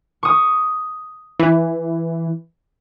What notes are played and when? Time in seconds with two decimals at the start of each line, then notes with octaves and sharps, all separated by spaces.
0.23 C#6 D#6
1.39 E3